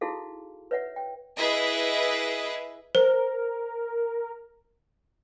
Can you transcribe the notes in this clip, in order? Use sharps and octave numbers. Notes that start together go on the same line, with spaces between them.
D#4 E4 F#4 G#4 A4 F5
B4 C#5 E5 F#5
G5
E4 G#4 B4 D#5 E5
A#4 C5